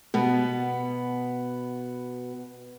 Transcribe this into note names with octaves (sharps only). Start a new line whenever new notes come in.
B2 B3